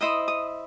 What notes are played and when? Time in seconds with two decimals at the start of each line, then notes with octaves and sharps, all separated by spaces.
0.01 E4 C5 D#5 D#6
0.28 D#6